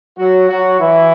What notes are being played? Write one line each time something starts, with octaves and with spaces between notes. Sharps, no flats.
F#3 F#4
F#3 F#4
E3 E4